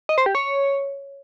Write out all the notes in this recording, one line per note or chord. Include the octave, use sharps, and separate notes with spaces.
D#5
C5
G4
C#5